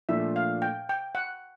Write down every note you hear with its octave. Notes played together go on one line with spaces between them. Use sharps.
A#2 F3 A3 D4 E5
F5
G5
G5
F#5